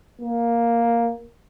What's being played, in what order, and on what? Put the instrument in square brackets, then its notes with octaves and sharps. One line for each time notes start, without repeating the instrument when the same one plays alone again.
[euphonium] A#3